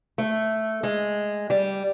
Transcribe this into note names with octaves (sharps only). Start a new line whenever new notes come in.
A3
G#3
G3